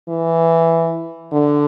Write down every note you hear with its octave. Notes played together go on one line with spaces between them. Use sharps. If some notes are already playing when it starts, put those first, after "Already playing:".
E3
D3